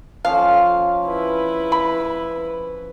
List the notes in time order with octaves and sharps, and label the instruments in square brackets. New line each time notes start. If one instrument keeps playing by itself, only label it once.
[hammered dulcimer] F3 C#4 [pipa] F5
[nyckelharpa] E4 B4
[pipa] B5